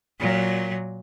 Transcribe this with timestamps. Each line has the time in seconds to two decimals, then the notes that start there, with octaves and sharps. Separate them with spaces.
0.20 A#2 F#3